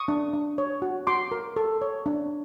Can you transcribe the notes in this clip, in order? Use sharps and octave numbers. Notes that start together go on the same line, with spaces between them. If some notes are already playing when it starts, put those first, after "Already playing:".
Already playing: C#6 D#6
D4
D4
C#5
F#4
F#4 C6 D6
A#4
A4
C#5
D4